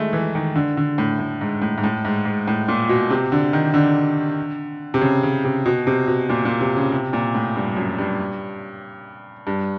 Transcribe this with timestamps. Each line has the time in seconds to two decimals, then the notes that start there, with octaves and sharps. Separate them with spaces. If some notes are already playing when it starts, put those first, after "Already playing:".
Already playing: D#3 G#3 A3
0.13 E3
0.35 D#3
0.56 D3
0.77 D3
0.98 A2
1.19 A2
1.41 G#2
1.62 A2
1.78 G#2
1.84 A2
2.05 G#2
2.25 G#2
2.48 A2
2.68 A#2
2.89 B2
3.10 C3
3.32 D3
3.53 D#3
3.74 D3
4.94 C3
5.01 C#3
5.23 C#3
5.45 C3
5.66 B2
5.87 C3
6.07 B2
6.29 A#2
6.45 A#2
6.61 C3
6.77 C#3
6.92 C3
7.13 A#2
7.35 A2
7.56 G2
7.77 F#2
7.99 G2
9.47 G2